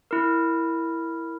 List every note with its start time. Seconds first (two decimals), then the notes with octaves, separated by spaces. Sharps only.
0.11 E4 A#4